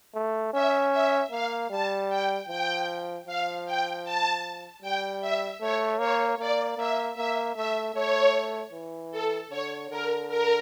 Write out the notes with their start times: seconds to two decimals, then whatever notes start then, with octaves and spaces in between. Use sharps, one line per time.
0.14 A3
0.53 C#4 E5
0.92 E5
1.31 A#3 F5
1.70 G3 A5
2.09 G5
2.48 F3 G5
3.27 F3 F5
3.66 G5
4.04 A5
4.82 G3 G5
5.21 E5
5.61 A3 C#5
5.99 A#3 C#5
6.38 A#3 D5
6.77 A#3 E5
7.16 A#3 E5
7.55 A3 E5
7.94 A3 C#5
8.72 E3
9.12 A4
9.50 D3 C#5
9.90 D3 A#4
10.29 A#4